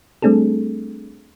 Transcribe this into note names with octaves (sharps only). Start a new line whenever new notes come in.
G3 A3 C4 D4 G#4 A4